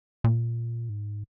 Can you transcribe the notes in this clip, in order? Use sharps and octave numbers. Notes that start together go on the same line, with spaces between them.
A#2
G#2